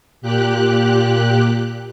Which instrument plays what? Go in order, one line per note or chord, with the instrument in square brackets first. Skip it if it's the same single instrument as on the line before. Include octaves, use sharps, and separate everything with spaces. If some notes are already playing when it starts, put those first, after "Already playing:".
[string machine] A#2 G4 F#6